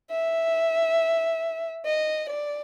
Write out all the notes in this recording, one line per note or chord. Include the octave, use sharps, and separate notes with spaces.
E5
D#5
D5